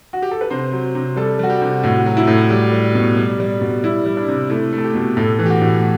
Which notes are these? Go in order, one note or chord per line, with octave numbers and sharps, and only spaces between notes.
F#4
G4
A4
B4
C3 C5
F#3
C3
G3 A4
G3 F#4
G4
C3
A2 F#4
F#3
E4
A2
G3 G4
G3
B2
G3
G3
B2
G3 E4
G3
D4
C3
A3 E4
A3
A4
G4
B2
A2 A4
E3
G4
F#4
A2